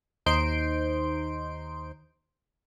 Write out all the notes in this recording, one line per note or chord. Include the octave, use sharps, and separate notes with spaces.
D#2 D#4 C5 C6 G6 D7